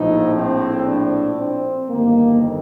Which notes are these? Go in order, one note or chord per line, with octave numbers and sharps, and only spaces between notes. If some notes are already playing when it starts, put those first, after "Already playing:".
Already playing: A#1 A2 F3 D#4
C4
D4
C4
G1 F2 D#3 G3 A#3